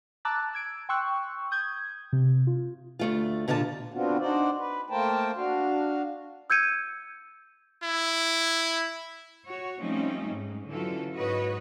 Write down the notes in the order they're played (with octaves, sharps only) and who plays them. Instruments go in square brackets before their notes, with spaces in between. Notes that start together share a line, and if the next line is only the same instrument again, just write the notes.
[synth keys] A5 A#5 D6 E6 F#6 A6
E6 G#6 D7
G5 C6 C#6 E6 F#6
D#6 G6 G#6
C3
F4
[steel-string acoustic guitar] D2 A3 F4
A#2 D3 F4 D5 A5
[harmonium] D3 B3 C4 D4 F4 F#4
D4 D#4 F#4 C5 D5
B4
A3 A#3 A#4 C5 G5 A5
D4 F#4 F5
[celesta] E6 G6 G#6 C#7 D#7
[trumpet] E4
[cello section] F#4 C#5
F3 G3 A3 C4 C#4 D#4
G#2
D3 E3 F#3 C#4 F4 A4
G#2 F#4 B4 C#5 D#5